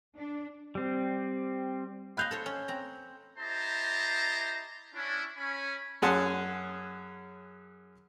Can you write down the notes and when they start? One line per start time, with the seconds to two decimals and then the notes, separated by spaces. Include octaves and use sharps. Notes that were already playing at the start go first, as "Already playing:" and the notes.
0.17 D4
0.75 G3 C4
2.17 D#5 F5 G#5 B5 F#6 G6
2.31 A4 C5 C#5
2.46 C#4
2.68 C4 A#5
3.39 E4 G4 C5 D#5 A5 A#5
4.94 C#4 D4 E4
5.37 C#4 G#5 B5
6.02 F#2 C#4 G#4 F#5 A5 C6